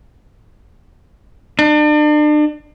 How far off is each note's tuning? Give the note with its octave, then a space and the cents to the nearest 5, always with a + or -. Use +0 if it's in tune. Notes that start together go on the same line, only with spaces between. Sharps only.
D4 +40